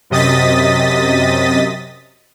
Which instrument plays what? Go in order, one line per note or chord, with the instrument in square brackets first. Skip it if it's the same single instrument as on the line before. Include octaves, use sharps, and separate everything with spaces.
[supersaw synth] F#2 C3 D#5 D#6 A6 B6